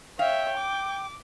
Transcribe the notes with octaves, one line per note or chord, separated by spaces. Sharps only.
C#5 E5 F5 G5
D6